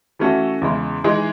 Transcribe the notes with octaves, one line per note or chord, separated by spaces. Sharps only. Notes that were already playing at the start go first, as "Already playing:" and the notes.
E3 A3 C#4 F#4 A4
E2 C#3 G#3
E3 G#3 D#4 G#4